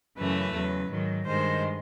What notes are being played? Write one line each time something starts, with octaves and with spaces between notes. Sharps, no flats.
F#2 C#3 E3 A3 B4
E2 C#3 F#3
G#2 D#3 F#3
G2 D#3 G#3 C5